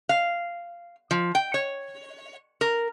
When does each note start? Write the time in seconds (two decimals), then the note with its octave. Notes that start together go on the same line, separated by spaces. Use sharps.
0.09 F5
1.11 F3
1.35 G5
1.54 C#5
2.61 A#4